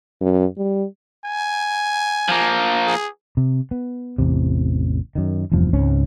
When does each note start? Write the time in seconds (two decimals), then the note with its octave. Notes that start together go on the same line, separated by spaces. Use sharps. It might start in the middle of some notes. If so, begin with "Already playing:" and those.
0.21 F#2
0.58 G3
1.25 G#5
2.28 F3 A#3
2.87 G#4
3.37 C3
3.71 B3
4.18 A1 E2 C3
5.15 F#2 D#3
5.52 F1 E2 G2 F3
5.73 C#2 G#2 C4 C#4